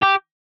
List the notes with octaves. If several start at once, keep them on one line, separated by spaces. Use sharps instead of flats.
G4